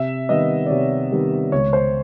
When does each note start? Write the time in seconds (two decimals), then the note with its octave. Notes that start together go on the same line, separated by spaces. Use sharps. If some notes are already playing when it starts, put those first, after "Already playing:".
Already playing: C3 E5
0.29 D#3 G3 B3 D#5
0.66 D5
0.70 C3 C#5
1.11 D#3 G3 B3
1.52 C#2 C#5
1.73 C5